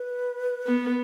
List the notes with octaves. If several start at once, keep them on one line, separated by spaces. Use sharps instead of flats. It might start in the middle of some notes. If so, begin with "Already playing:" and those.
Already playing: B4
B3